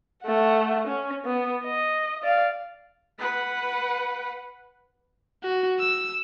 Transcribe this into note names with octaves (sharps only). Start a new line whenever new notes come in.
A3 F#5
C#4
B3
D#5
D5 F5
B4 F#5
F#4
E6